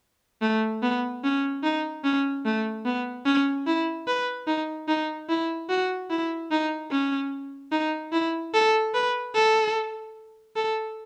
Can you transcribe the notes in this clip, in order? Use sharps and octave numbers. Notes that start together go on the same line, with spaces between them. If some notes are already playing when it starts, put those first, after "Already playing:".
A3
B3
C#4
D#4
C#4
A3
B3
C#4
E4
B4
D#4
D#4
E4
F#4
E4
D#4
C#4
D#4
E4
A4
B4
A4
A4